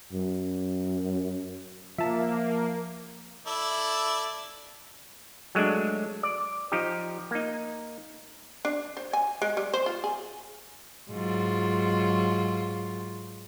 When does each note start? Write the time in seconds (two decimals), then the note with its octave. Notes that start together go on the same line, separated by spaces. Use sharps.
0.13 F#2
1.98 F3 A#3 A#4 E5 A5
3.47 E4 A4 D5
5.55 F#3 G#3 A3 D4
6.23 D5
6.72 F3 D#4 G4
7.31 A#3 D#4
8.65 D4
8.97 C5
9.13 G#5
9.42 G#3
9.57 G3
9.74 C5
9.86 F4
10.04 G#4
11.10 G#2 F#3 F4